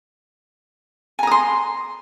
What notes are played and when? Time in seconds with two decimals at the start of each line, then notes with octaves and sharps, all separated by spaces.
1.19 G#5
1.23 A#5
1.27 D#6
1.31 C6